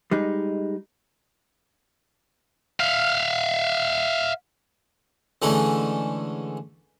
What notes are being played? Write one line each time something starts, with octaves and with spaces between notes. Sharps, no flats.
G3 G#3 D#4
E5 F5
D3 E3 G#3 A3 C#4